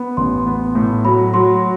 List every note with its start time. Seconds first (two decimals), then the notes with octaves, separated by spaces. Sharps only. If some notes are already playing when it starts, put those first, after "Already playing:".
Already playing: B3
0.17 A1 C6
0.46 B3
0.75 A2
1.05 F#3 B5
1.34 F#3 C6